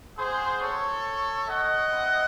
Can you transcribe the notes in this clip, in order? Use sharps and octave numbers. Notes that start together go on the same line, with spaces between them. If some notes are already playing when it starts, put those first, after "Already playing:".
C4 F#4 G#4 C5
A4 C#5
D#5 F#5
C4 E4